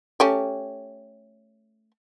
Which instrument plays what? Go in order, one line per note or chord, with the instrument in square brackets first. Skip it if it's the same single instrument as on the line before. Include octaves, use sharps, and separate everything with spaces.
[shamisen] A3 C#4 G4